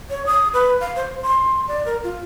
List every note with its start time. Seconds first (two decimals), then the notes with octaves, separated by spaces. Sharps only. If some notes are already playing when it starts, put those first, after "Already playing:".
0.10 C#5
0.26 D#6
0.54 B4
0.81 F5
0.96 C5
1.23 C6
1.68 D5
1.86 A#4
2.04 F4